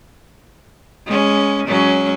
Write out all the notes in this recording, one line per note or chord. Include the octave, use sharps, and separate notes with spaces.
G#3 C#4
F#3 G#3 C#4